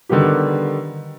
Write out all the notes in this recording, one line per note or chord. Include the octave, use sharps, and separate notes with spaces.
D3 D#3 G3 B3 G4